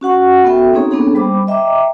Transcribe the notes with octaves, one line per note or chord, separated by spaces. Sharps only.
C#4 F#4 F#5 C#6
B3 F#4 A4 E5 G5
A#3 C4 C#4 D#4 G#4 C#5
A#3 B3 C#4 D4 G#4 A4
G3 C5 B5 D6
D#5 E5 G5 A#5 D6